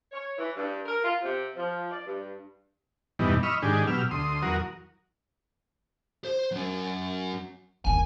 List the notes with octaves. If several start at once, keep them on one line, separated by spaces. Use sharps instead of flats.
C#5
E3
G2
A#4
F4
C3
F3
D5
G2
E2 G2 B2 E3 G3 D#4
D#5 B5 C#6 E6 F6
G#2 D#3 D4 G4 G#4
B2 F#3 G4 E6 F6
D2 C6 D#6
E2 F#3 F#4 A#4 D#6
C5
F#3 C#4
G1 D#2 G#5